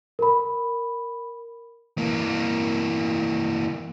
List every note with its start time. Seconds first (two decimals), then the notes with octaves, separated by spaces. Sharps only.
0.19 A#4 B5
1.98 E3 A#3